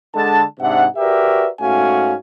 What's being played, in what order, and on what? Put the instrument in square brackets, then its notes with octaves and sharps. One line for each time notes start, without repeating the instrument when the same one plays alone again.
[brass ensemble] D3 G#3 A5
G#2 C3 D4 E5 F#5
F#4 G4 A#4 B4 D5 E5
G#2 A3 C#4 F#4 F5 G#5